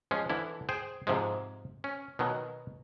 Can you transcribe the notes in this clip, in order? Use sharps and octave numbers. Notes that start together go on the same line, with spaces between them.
F3 G#3 C#4
D3 E3 E4
G#4 C5 G5
G#2 C3 F3 G#3
C#4
B2 D#3 F#3